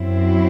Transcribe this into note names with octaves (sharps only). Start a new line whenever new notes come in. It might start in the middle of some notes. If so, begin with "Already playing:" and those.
Already playing: F#2 F#3 C4 E4